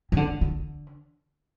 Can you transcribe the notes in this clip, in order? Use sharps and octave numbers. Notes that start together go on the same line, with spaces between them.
D#3
D3
D3